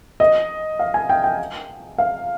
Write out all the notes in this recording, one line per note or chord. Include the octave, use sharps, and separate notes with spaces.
D#5
F5
G#5
G5
G5
F5